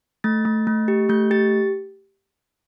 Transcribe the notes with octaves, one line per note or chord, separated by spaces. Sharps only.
A3 A6
A3
A3
G4
A3 G6
G4 A6